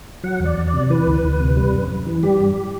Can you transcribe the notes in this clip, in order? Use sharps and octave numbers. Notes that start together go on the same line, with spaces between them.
F#3 F#5
E2
D5
E2
D5
C3
E3 B4
D2
D2
C3
G3
F#2
F#2
E3
G3 G4
G2